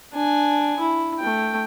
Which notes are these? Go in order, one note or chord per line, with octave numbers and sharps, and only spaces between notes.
D4 G#5
E4
A3 G5